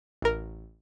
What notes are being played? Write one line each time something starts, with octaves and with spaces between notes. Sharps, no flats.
A1 A#4